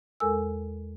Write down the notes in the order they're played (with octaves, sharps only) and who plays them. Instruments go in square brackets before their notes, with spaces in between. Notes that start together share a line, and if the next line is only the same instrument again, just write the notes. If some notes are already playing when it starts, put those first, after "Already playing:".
[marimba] E2 G#3 A4 A#4 G#5 E6